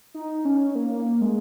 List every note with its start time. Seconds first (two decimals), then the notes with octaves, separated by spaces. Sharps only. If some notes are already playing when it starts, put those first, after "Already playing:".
0.14 D#4
0.45 C#4
0.75 A#3
1.21 G#3